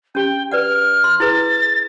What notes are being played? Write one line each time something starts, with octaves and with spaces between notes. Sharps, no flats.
C#4 G4 G5
B4 D5 F#5 F6
C6
E4 G#4 B4 A6